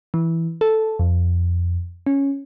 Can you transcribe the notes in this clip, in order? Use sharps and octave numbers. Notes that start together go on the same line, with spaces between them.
E3
A4
F2
C#4